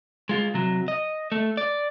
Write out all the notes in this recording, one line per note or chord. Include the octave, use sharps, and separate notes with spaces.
G#3 F4
C3 F#3
D#5
A3
D5